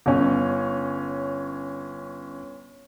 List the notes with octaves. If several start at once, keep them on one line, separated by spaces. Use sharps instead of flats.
G1 C#4